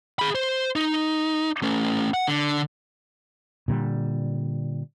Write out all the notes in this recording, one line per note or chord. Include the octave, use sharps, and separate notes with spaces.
G#4 B5
C5
D#4
A3 C#4
F#5
D3
A#2 D3 G3